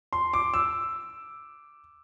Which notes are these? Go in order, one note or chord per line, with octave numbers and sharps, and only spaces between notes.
C6
D6
E6